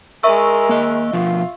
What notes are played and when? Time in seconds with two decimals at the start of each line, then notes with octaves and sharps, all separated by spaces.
0.23 G#3 A#4 E5 C#6 E6
0.69 A#3 D#5
1.13 B2 F3 F4